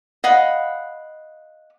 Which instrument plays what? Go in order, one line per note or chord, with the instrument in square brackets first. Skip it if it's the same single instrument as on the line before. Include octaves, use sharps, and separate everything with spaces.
[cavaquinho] D#5 F5 F#5 B5